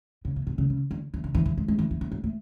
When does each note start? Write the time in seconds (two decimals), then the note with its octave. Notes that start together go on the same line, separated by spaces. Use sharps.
0.25 C#3
0.36 B2
0.47 B2
0.58 C#3
0.70 C#3
0.91 D3
1.14 E3
1.24 D3
1.35 E3
1.46 E3
1.58 G#3
1.68 G#3
1.79 E3
1.91 E3
2.01 E3
2.12 F#3
2.24 A3